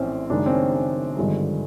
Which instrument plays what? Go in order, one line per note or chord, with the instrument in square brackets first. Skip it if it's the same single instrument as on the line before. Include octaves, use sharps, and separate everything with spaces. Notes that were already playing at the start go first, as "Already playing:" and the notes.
Already playing: [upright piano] A#1 A2 E3 C4 C#4
F#1 F#2 D#3 G#3 D4
C4
C#4
C#4
G#1 G2 D3 F3 G#3